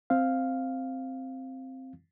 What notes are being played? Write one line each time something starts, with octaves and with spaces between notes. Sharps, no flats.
C4 F5